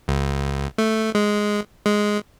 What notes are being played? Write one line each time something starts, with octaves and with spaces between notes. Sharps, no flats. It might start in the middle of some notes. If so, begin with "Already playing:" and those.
C#2
A3
G#3
G#3